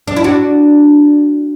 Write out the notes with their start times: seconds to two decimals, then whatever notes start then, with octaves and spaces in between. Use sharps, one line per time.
0.08 D4
0.16 E4
0.24 D4 F#4